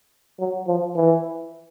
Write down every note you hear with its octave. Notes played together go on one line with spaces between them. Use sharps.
F#3
F3
E3